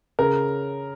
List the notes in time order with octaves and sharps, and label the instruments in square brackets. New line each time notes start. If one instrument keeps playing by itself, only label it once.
[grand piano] C#3 A#4